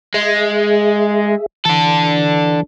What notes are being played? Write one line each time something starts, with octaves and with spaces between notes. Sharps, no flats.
G#3 G#4 E5
E3 D4 A4